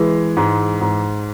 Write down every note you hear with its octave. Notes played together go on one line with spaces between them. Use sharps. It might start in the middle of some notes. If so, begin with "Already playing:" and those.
Already playing: E3 G#3
G#2
G#2